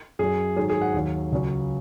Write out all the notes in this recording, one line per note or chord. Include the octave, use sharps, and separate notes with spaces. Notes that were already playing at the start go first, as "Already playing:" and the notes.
F#2 F#3 G#4
G#2 D#3 F#3 G#4
G#4
F#5
D#2 D#3 F#3
C#2 C#3 F#3